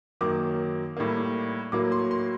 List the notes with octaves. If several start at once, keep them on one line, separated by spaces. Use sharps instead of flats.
F#2 D#3 F#3 A#3 D6
A2 G3 A#3
A2 F#3 A#3 D6
C6
C6